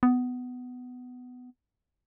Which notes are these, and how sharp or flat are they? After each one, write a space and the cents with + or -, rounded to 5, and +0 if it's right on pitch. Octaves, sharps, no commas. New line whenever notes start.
B3 +15